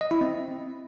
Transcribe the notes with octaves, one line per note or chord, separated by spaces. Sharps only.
D#5
E4
C4